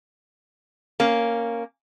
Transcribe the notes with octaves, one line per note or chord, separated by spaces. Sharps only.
A#3 C#4